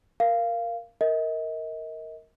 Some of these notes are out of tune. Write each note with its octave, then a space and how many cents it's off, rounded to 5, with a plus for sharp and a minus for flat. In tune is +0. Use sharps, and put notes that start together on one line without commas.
A#4 +0 F5 -15
A#4 -10 D#5 +35